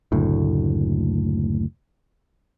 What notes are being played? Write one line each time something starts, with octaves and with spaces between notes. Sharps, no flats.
F#1 D2 A2